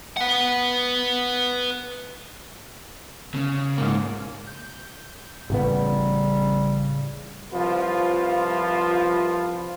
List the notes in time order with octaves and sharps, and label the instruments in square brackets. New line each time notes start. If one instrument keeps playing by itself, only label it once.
[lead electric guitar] B4 F#5
[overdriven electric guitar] C#3
[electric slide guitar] G#2 A#3
[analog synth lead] G6
[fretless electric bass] A1 A2 B3 [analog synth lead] C#3 [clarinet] G3
[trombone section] C2 F3 F4 B4